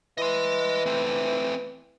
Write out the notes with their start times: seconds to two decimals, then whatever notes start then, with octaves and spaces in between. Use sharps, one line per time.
0.18 E3 D#5 C6
0.86 A3 C4